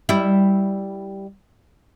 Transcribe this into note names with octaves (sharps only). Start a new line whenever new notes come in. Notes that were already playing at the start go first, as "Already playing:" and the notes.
G3 E4